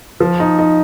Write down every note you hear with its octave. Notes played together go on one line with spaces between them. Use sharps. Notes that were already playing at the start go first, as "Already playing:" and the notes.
F3
D#4
D#4